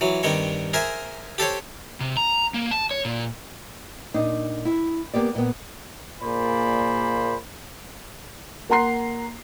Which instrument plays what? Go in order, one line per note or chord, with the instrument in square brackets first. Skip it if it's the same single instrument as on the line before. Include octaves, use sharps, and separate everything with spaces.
[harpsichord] E3 F#3
G2 D#3 G3 C4 C#6
G#4 A#4 C5 E5 G#5
G4 A4 C5 C#5
[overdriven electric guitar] C3
A#5
A#3
A5
C#5
A#2
[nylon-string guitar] A#2 D4 D#4
E4
A#3 B3 G4 D5
A#2 B3
[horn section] A#2 A#3 G#4 C5 D5 B5
[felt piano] A#3 F#5 A#5 C6 C7